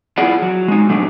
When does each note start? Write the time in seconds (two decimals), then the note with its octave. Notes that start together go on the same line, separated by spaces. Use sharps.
0.18 E4 F4 G#4 D5 F#5
0.42 F#3
0.68 G#3 D#4
0.89 B2 F#3 A3 D4